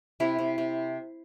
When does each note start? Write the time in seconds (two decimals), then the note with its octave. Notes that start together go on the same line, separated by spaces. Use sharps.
0.20 C3 E4
0.39 C3
0.58 C3